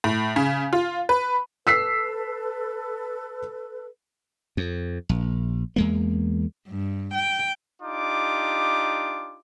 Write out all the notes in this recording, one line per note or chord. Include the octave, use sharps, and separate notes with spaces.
A2
C#3
F4
B4
A4 B4 E6 B6 C7
F2
A#1
E2 G#3 A#3
G2
G5
D4 D#4 F4 G4 D6